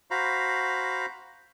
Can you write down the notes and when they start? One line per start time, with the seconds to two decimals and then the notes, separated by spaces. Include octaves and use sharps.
0.11 F#4 C5 F5 A#5 B5